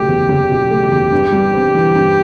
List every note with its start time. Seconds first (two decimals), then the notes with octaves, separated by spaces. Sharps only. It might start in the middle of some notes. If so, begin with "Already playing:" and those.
Already playing: F#1 B2 A3 G4
0.08 E2
0.29 F#1
0.50 B2
0.70 A3
0.91 E2
1.12 G2
1.32 G3
1.54 C4
1.75 E3
1.95 G2